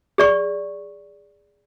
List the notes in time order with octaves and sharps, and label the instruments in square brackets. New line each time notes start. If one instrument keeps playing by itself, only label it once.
[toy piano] G#4 D5 C#6